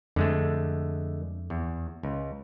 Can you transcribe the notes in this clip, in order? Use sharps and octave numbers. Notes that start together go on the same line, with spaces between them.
F2 D3 G#3 A3
E2
C#2